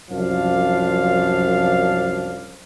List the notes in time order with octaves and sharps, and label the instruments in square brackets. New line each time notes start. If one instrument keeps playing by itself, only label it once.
[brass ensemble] C2 F#2 F3 D4 F5